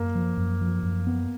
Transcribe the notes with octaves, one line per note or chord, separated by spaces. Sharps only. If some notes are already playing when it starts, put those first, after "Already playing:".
Already playing: F#2 A#3
F3
F#2
F3
F#2
B3